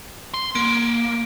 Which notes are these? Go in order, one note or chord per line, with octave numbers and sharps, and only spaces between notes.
C6
A#3 D7